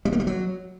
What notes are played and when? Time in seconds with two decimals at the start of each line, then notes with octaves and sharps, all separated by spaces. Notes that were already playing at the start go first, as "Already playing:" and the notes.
0.05 G3
0.13 A#3
0.20 G3
0.27 F#3